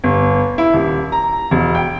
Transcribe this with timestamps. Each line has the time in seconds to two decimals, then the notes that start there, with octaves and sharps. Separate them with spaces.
0.04 G1
0.58 E4
0.73 D#1
1.12 A#5
1.51 E1
1.75 G5